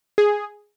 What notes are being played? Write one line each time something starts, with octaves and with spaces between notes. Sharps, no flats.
G#4